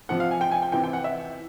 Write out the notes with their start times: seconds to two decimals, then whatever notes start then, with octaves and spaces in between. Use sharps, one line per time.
0.09 C3 F3 F#5
0.20 F5
0.31 G#5
0.41 G5
0.51 G#5
0.62 G5
0.72 C3 E3 G5
0.84 G5
0.93 F#5
1.04 E5